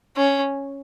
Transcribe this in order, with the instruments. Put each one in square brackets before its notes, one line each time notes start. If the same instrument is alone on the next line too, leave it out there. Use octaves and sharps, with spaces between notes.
[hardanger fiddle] C#4